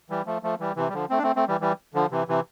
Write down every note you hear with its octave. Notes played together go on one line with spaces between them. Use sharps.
E3 G3
F3 A3
F3 A3
E3 G3
C3 E3
G3
D3 F3
A3 C4
D4
A3 C4
A3 C4
E3 G3
E3 G3
D3 F3
C3 E3
C3 E3